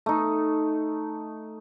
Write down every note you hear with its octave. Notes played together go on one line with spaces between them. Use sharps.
A3 D#4